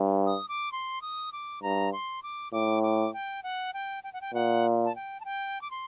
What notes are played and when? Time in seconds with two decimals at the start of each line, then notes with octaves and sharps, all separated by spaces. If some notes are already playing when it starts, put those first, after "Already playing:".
Already playing: G2
0.26 D#6
0.49 D6
0.72 C6
1.02 D#6
1.32 D6
1.62 G2 A#5
1.93 C6
2.23 D6
2.53 A2 D6
2.83 D6
3.13 G5
3.43 F#5
3.74 G5
4.04 G5
4.13 F#5
4.21 G5
4.34 A#2 F#5
4.85 A5
4.96 G5
5.20 A5
5.25 G5
5.62 D6
5.71 C6